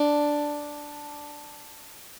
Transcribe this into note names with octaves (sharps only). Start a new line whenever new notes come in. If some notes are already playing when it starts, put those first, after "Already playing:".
Already playing: D4